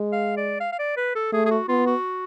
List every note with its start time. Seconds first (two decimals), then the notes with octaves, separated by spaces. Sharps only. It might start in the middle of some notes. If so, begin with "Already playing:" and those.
Already playing: G#3
0.12 F5
0.37 D5
0.60 F5
0.72 F5
0.79 D5
0.97 B4
1.15 A4
1.32 A3 G#4
1.46 G#4
1.51 F#4
1.69 B3 F4
1.87 F#4